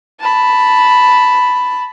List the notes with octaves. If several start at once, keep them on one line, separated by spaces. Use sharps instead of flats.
A5 B5